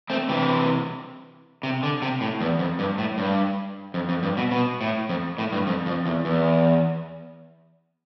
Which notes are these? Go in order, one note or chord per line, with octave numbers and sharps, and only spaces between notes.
A3 C4
C3 E3
C3
D3
C3
A2
E2
F2
G2
A2
G2
F2
F2
G2
B2
B2
A2
F2
A2
G2
F2
F2
E2
E2